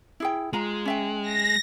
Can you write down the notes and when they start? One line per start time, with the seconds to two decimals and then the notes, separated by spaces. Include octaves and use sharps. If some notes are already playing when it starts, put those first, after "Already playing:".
0.20 E4 G#4 G5
0.53 G#3 F4 A#5
0.85 C#4 E5 G5
1.22 A#6